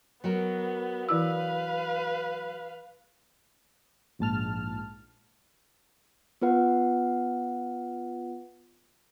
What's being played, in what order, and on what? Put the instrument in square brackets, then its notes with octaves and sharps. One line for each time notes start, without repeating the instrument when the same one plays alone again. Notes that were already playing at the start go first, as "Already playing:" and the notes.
[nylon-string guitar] F#3 F#4 A#4 [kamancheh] B3
[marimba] E3 E4 E6 [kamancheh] B4 F5
[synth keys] A#1 G#2 A5 F6
[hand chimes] B3 F4 B4 F#5